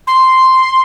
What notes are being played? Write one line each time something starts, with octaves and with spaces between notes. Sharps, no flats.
C6